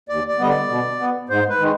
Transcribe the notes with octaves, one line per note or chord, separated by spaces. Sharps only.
D#2 D5
D5
D3 G3 B3 D#5
D5
B2
B3
G#2 C5
B4
D#3 G#3